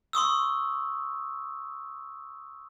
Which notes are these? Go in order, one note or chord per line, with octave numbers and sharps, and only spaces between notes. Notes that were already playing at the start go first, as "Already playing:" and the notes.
C6 C#6 D#6 E6